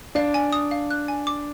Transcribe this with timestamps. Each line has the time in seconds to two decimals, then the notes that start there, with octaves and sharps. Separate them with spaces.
0.15 D4 F5
0.34 G#5
0.52 D#6
0.71 F5
0.90 F#6
1.08 G#5
1.27 D6